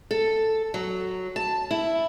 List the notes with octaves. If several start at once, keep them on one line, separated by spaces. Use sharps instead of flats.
A4
F#3
A5
E4